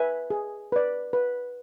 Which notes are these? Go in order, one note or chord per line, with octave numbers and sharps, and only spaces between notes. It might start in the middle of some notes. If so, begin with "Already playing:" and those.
Already playing: B4 E5 G#5
G#4
B4 D5
B4